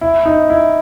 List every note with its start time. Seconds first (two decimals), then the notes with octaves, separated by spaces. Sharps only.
0.01 E4
0.25 D#4
0.50 E4